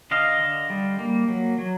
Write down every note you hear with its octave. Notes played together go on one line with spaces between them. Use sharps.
D3 D#5 F5
D3
G3
A#3
F#3
F#3